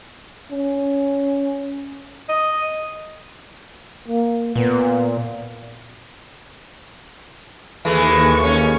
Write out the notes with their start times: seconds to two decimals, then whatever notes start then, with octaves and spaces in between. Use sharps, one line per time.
0.51 C#4
2.29 D#5
4.08 A#3
4.55 A#2 B3
7.85 D#2 E3 G#3 A3 C#6
8.44 C#4